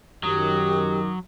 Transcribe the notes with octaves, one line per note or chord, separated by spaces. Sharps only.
F#2 D#3 F#3 G4 D#6